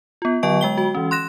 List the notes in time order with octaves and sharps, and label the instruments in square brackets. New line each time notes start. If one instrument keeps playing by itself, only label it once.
[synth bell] B3 F4
D3 F#3 D#5 G5 C#6 D7
G#3 G5 G7
F#4
E3 C#4
C6 F#6 A#6 E7